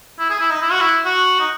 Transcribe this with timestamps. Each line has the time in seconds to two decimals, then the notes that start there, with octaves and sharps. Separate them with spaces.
0.19 E4
0.30 G#4
0.40 E4
0.50 D#4
0.62 E4
0.71 F#4
0.81 E4
1.05 F#4
1.40 D#4